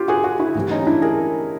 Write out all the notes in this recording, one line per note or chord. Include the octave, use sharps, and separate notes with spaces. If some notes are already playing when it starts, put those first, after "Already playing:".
Already playing: F4 G4
F#4 G#4
F#4 G#4
E4 F#4
A2 E3 G3 C4
C#4 D#4
D4 E4
G#4 A#4